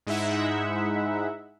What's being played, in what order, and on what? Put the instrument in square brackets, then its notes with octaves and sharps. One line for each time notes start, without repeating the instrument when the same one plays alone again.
[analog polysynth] G#2 G#3 D#4 E4 E5 F#5